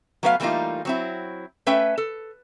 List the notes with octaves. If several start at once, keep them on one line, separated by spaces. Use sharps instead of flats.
F#3 A3 B3 B4 C#5 F5
E3 G3 A3 A#3 D#4 F4
F#3 C4 E4
A3 C#4 B4 E5 G5
A4